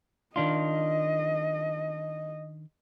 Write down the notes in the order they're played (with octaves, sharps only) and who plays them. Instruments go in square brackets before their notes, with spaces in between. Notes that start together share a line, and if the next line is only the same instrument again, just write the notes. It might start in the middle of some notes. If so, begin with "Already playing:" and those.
[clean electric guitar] D#3 D4 F4 [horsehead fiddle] D#5